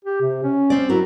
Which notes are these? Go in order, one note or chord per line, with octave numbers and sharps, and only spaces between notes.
G4
C3
C#4
C4 D5
F#3 E4 F#4 A#4